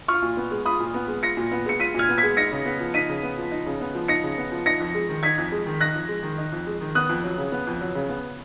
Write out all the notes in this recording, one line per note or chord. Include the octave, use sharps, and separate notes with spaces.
F4 C#6 F6
A#2
B3
G#3
F4 B5 D#6
A#2
B3
G#3
F4 A#6 C#7
A#2
B3
G#3 C#7
F4 B6 D#7
A#2 F6 G#6
B3
G#6 B6
G#3
D#4 A#6 C#7
C#3
B3
F3
D#4 B6 D#7
C#3
B3
F3
D#4
C#3
B3
F3
D#4 A#6 C#7
C#3
B3
F3
D#4 A#6 C#7
F2
G#3
D#3
D#4 G#6 B6
F2
G#3
D#3
D#4 F#6 A#6
F2
G#3
D#3
D#4
F2
G#3
D#3
B3 D#6 F#6
F2
F#3
C#3
B3
F2
F#3
C#3
B3